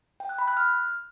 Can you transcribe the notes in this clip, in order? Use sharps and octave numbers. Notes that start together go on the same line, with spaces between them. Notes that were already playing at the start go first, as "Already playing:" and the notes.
G5
F#6
B5
F#6
F6